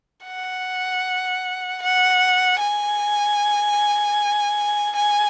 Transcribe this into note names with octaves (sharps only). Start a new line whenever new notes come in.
F#5
F#5
G#5
G#5